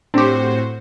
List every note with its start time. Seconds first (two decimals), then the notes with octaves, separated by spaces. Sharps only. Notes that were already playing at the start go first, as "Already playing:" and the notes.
0.14 A2 C4 D4 F#4 G4 C5